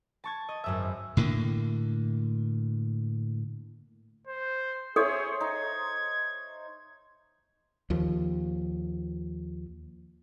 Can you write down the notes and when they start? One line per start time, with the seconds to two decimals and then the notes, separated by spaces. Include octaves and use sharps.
0.24 A5 C#6 G#6
0.49 D#5
0.64 G#1 F#2 E5
1.17 A2 D3 A#3
4.27 C5
4.96 G#4 A4 C5 C#5 E5
5.40 D#4 G#6
7.90 D#2 F3